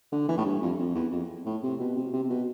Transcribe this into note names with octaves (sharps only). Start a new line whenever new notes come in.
D3
E3
A2
G2
F2
F2
E2
F2
A2
C3
B2
C3
C3
C3
B2